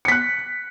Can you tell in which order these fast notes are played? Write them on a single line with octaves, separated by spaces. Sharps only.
C#7 B6 F#6